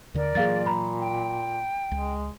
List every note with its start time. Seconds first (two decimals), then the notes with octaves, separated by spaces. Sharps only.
0.14 D#2 D3 A#4 D5
0.35 A#2 E3 F#3 A#3 G#4 F5 A6
0.66 A#5 B5
1.00 G5
1.91 C#2 G#3